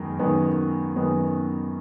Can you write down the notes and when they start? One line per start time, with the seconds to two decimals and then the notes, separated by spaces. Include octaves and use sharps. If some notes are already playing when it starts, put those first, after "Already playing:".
Already playing: F#2 D#3 G#3 B3
0.19 F#2 D#3 G#3 B3
0.96 F#2 D#3 G#3 B3